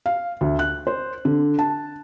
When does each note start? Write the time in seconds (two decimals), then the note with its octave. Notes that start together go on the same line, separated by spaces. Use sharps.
0.06 F5
0.41 D2
0.59 F#6
0.87 C5
1.25 D3
1.59 A5